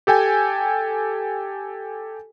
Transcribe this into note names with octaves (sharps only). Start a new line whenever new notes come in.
G4 A4 G5 G#5